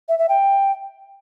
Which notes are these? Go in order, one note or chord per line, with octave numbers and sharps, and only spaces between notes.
E5
E5
G5